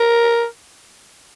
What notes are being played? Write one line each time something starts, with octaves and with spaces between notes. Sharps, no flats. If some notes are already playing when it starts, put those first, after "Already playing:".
Already playing: A#4